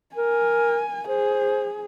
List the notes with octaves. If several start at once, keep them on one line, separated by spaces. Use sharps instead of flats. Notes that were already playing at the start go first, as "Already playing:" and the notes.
A#4 G#5
G#4 C5